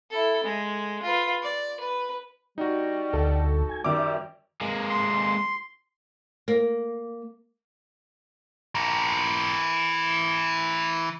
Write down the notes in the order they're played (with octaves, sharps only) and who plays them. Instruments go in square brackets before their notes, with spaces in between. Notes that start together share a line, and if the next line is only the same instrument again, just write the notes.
[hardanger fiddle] E4 A4
G#3
F4 B4
D5
B4
[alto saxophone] G3 [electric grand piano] D#4 F#4
[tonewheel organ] D2 [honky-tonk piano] A4
[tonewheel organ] G#5
[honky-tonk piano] F#2 D#3 [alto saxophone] G3 [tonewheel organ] D5 E5 [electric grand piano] D6
[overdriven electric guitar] G#3 A#3
[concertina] C6
[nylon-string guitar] A#3
[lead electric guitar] E3 A#4